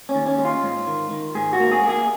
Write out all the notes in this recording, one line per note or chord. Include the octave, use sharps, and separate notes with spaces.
C#4
D#2
C#4
G#3
F4
G#2
D#3
D#3
G#2 G#4
F#4
A#3
G#4
A#3 G#4